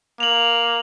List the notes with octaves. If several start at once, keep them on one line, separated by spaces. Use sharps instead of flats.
A#3 F7 F#7